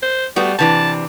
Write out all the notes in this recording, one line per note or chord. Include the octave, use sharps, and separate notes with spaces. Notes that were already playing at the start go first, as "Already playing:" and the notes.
C5
G3 A3 B3 F#4
C3 E3 D4 A5